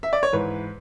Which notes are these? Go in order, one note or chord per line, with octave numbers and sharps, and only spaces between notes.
E5
D5
C#5
G#2 E3 B4